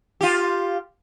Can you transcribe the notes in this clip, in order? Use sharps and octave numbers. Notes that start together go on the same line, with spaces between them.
F4 G4